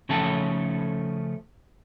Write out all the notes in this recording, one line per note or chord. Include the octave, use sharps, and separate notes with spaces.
C#3 F3 A3 C#4 A4 A5